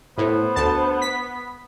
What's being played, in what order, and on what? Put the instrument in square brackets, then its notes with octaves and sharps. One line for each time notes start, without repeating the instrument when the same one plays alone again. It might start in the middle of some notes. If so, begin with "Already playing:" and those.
[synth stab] A2 [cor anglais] B3 [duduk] C5
[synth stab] D2 A5
B6